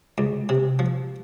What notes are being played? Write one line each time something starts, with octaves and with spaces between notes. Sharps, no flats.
C#2
C3
F3